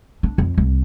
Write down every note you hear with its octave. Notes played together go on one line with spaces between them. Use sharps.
D4
F2
C2